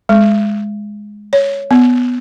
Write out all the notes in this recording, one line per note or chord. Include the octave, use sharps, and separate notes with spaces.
G#3
C#5
B3